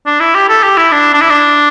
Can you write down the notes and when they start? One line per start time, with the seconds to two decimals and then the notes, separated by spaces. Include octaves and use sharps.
0.06 D4
0.20 E4
0.35 G4
0.49 A4
0.63 G4
0.77 E4
0.92 D4
1.14 D4
1.21 E4
1.30 D4